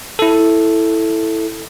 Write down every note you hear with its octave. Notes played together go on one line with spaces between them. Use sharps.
E4 A4